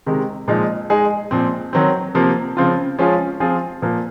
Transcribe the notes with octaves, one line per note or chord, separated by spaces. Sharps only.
C3 D#3 G#3
A#2 F3 G#3 D#4
G#3 D#4 G#4
A#2 F3 C4
D#3 F#3 C4
C3 F3 A#3
C#3 F3 C4 F4
F3 G#3 C#4 F4 G#4
F3 C4 F4 G#4
A#2 F3 A#3